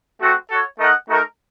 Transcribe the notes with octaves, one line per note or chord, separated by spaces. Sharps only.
A3 C4 F#4
F#4 A4 C#5
A3 D#4 A#4 D#5 F#5
A3 D#4 F#4 A#4